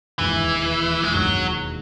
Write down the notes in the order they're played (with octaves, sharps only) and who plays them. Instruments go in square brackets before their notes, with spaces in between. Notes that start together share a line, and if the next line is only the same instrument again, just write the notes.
[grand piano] E1 D#2 D#3 G#3 D#4 [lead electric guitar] E3
[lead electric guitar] G#3
[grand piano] E1 D#2 D#3 G#3 D#4 [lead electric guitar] F#3